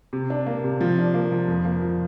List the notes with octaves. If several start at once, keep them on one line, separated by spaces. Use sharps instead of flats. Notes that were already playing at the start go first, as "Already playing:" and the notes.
C3
D4
A#3
C3
F3
D4
A#3
F3
F2
A#3
F3